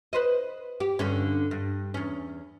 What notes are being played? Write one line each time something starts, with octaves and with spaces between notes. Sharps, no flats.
B4 C5 D#5
G4
G2 D3 C#4
G2
E2 C#4